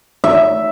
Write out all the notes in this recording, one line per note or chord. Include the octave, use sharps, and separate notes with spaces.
E5